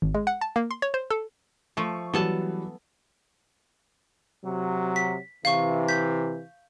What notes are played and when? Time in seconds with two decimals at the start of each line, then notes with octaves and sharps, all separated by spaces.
0.02 G#1
0.14 G#3
0.27 F#5
0.41 A5
0.56 A#3
0.71 C6
0.82 C#5
0.94 C5
1.10 A4
1.77 F3 A3 C#6
2.14 E3 F#3 G3 B3 A4 A5
4.45 C3 F#3
4.96 B6
5.45 C3 E3 F5 C#6
5.88 G6 B6